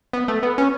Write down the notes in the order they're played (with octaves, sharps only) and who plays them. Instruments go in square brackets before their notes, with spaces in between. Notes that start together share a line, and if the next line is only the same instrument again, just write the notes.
[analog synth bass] B3
A3
B3
C#4